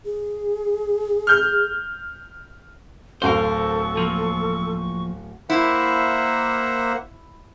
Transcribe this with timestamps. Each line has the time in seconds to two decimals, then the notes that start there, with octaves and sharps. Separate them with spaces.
0.05 G#4
1.27 F6 G6
3.22 D1 F#4 A4 A#4 C5 F5 C#6
3.97 F3 A#3
5.50 A#3 E4 C5 E5 F#5